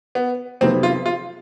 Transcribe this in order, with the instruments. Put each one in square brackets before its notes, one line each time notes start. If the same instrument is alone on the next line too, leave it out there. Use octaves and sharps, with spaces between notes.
[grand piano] B3
[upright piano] F2 C3 D#3 F#3 B3 [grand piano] C4
[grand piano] F4
F4